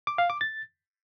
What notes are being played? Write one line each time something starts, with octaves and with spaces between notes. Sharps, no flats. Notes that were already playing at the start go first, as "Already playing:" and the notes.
D6
F5
D6
A6